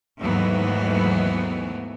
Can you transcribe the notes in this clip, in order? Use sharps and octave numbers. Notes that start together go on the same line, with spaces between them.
D#2 G#2 E3 F#3 A3 B3